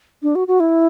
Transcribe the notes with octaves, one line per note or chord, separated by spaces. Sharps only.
D4
F#4
F#4
E4